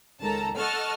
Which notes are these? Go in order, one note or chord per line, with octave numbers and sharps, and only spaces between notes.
C#2 D#3 A4 A5 A#5
A4 D#5 F#5 A5 C#6 F6